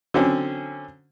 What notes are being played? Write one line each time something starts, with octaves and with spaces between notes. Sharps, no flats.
D3 F#3 C4 C#4